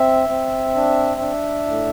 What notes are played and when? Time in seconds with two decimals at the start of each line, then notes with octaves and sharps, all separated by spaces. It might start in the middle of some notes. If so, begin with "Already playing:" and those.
Already playing: C4 E5
0.29 C4
0.76 D4
1.21 D4
1.67 A2